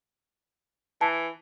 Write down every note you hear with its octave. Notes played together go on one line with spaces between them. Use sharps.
E3 A5